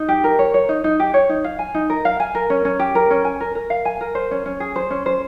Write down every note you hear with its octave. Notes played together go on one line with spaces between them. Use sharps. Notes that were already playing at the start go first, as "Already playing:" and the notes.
Already playing: D#4
G4
A#4
C#5
C#5
D#4
D#4
G4
C#5
D#4
F5
G#5
D#4
A#4
F5
G#5
A#4
C#4
C#4
G4
A#4
C#4
G#5
A#4
A#4
F5
G#5
A#4
C5
C#4
C#4
G#4
C5
C#4
C5